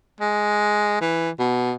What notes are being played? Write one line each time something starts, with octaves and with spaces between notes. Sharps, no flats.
G#3
E3
B2